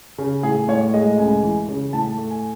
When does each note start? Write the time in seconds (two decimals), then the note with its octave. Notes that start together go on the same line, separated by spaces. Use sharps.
0.18 C#3
0.43 A2 G#4
0.68 A2 C#5
0.94 G#3 D#5
1.19 C#2 G#5
1.43 E3
1.68 C#3
1.93 A2 A5
2.17 A3
2.30 G#5